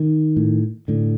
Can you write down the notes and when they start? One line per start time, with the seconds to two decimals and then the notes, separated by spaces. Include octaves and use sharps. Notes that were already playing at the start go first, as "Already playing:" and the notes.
Already playing: D#3
0.37 A2
0.88 A2 D3